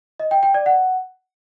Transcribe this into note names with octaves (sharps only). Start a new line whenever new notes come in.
D#5
G5
G5
D5
F#5